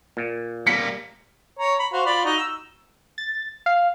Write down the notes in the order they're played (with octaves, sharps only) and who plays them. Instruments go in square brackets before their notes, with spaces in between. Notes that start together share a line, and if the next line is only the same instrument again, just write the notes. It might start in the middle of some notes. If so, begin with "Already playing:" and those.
[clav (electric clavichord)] A#2
[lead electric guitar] G3 A#3 [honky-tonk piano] B6 C#7
[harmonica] C#5 A#5
B5
F#4 C5 F5
F4 D5 B5
D#4 F#4
E6
[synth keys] A6
F5